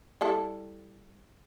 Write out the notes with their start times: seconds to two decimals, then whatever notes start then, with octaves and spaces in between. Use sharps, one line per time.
0.21 G3 E4 A4